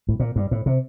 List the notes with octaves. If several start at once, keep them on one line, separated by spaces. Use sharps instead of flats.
A2
A#2
G2
A2
C3